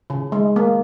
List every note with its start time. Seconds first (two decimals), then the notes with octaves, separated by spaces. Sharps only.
0.10 C#3
0.32 G#3
0.56 A#3